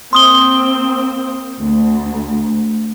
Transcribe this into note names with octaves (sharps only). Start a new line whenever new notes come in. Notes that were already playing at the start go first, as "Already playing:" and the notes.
A#3 C4 C6 D#6 G7
D2